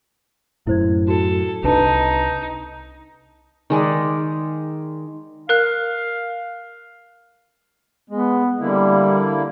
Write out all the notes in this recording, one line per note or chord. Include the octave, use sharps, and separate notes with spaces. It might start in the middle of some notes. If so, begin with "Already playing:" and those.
F#2 A2 E4 C5 G#6
F#4 A4
C2 D4 D#4 B4 A5
D#3 G#3 D5
A#4 F5 F#6
G#3 B3
D3 G3 A#3 E4